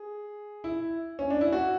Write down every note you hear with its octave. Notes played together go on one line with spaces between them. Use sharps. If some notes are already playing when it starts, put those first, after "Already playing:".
Already playing: G#4
E4
C#4
D4
E4
F#4